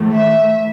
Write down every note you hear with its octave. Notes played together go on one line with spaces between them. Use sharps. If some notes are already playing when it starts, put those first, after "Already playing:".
Already playing: A2 E3 A3
E5